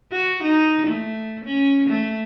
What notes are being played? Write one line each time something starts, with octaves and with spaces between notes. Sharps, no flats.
F#4
D#4
A3
C#4
A3